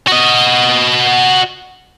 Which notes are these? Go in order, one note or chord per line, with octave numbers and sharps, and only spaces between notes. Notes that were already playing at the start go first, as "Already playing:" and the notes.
F#4 D#5